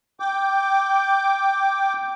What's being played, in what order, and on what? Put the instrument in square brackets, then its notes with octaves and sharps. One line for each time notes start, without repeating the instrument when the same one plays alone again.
[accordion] G5 D6